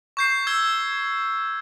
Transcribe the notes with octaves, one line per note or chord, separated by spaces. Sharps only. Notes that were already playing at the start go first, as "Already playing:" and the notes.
C#6 G6 C7
E6 G#6 G7